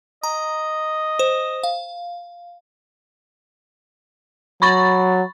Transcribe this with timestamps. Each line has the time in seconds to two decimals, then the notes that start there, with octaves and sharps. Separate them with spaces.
0.23 D#5 A#5
1.19 C5
1.64 F5
4.62 F#3 B5 C#6 A6